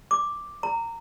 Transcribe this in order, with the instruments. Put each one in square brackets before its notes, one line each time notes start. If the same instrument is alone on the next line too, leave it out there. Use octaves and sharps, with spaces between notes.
[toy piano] D6
A#5